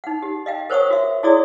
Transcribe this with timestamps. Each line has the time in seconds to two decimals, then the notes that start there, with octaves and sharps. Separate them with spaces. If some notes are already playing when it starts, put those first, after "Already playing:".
0.04 D#4 F#5
0.22 G4
0.46 D#5 F5 G5
0.70 A#4 C5 C#5 F#5 C#6 D#6
0.90 F#4 E5
1.23 E4 F#4 G#4 C#5 D5 D#6